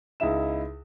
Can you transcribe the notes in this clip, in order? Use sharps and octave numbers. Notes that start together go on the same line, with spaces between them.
C#2 D#4 E4 E5 E7